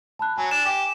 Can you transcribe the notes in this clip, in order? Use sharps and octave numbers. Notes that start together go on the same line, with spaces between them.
A5 B5 F#6
F#3 G#5
D4 E7
G4